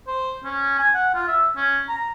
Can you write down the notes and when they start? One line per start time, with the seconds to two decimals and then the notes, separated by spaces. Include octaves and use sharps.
0.07 C5
0.44 C#4
0.79 G#5
0.94 F#5
1.15 F4
1.28 E5
1.57 C#4
1.89 A#5